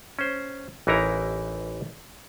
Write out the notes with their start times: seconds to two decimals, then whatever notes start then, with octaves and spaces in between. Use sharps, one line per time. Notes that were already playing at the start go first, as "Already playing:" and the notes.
0.19 C#4 C5
0.87 A1 E3 D#4 E4 A#4 A#5